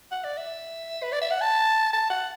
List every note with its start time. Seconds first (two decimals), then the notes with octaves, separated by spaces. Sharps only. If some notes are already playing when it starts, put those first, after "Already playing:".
0.11 F#5
0.24 D5
0.37 E5
1.03 B4
1.12 D5
1.21 E5
1.31 F#5
1.41 A5
1.93 A5
2.10 F#5